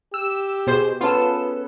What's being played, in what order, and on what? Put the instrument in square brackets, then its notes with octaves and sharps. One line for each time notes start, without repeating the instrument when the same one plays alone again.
[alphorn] G4 [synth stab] E6
[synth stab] B2 C5 [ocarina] G#4
[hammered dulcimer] B3 C#4 A4 [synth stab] F4 E7 [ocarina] B4